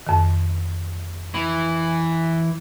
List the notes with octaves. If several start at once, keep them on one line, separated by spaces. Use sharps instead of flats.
F2 D#3
E3